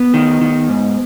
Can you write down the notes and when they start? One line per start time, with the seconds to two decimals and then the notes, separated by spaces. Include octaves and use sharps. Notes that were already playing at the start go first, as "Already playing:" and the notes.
Already playing: B3
0.14 D#3
0.41 D#3
0.69 G#2